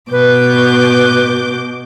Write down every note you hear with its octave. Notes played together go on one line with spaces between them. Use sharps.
B2 B4 D6 G6